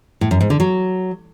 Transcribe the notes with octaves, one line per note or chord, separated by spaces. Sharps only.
A2
F#2
G#2
D3
F#3